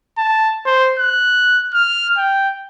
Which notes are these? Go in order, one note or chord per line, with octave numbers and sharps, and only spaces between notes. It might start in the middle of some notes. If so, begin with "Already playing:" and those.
A5
C5
F#6
F6
G5